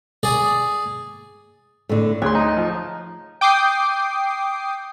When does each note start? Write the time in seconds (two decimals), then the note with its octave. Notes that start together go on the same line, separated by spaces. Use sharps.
0.23 G#4 D5
1.89 A2 D3
2.22 D2 G#4 C#5 C6
2.35 D#4
2.57 F3
3.41 G5 D6 D#6 C7